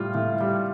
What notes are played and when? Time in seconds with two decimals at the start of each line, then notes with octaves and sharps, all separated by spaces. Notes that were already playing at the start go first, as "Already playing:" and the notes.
Already playing: A2 G3 F4
0.15 A2
0.41 G3